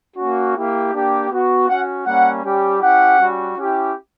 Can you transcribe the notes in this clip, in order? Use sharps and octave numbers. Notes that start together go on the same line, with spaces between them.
A#3 C#4 F#4
A#3 E4 G4
A#3 D4 G4
B3 F#4
C#4 F#4 F#5
G3 A#3 C#4 F#5
G3 C#4 G4
C#4 E4 G4 F#5
G3 C#4 F#4
C#4 E4 G4